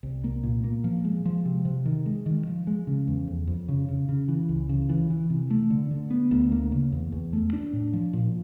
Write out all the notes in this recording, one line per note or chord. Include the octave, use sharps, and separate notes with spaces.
C2
A#3
A#2
A#3
F3
G#3
F3
C3
C3
D#3
G#3
D#3
F3
G#3
C#3
E2
F2
F2
C#3
C#3
C#3
E3
C#2
C#3
E3
E3
C3
A3
D3
D3
B3
D2
A#3
C#3
E2
E2
A3
D4
A2
F3
A#2